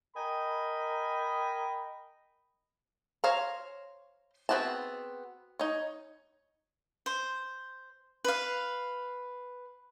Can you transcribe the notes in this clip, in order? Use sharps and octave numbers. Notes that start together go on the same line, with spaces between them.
A#4 D#5 G5 G#5 B5
C5 C#5 F5 A#5
B3 C4 F#4 G#4 A5
D#4 C#5
C5
B4 F5